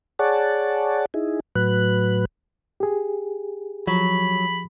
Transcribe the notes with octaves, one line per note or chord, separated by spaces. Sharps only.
G#4 C#5 D5 F#5 A5
D#4 E4 G#4
A2 F#3 B4 F#6
G4 G#4
F3 F#3 B5